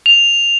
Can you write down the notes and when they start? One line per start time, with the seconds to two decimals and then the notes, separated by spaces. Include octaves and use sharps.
0.06 F7